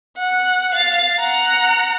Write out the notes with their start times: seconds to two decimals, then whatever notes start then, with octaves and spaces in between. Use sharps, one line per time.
0.18 F#5
0.75 F5 A6
1.19 F#5 A#5